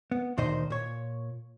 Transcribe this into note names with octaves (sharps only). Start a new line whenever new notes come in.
B3
D2 A#2 D#3 D#4 C5 D#5
A#2 C#5